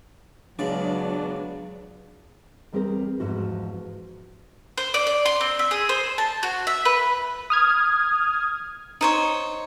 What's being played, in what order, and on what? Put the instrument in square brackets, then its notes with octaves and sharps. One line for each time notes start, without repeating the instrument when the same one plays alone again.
[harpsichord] C#2 C#3 D5 [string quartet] F#3 B3 [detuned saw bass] D4
[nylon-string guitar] E2 G3 C4 G#4 A#4 C5
E2 G#2 F3 F#4
[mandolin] C5
D5
D5
C6
C4
E5
G#4
C5
A5
F#4
E5
B4
[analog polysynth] D#6 F6 G#6
[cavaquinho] D#4 C5 C#5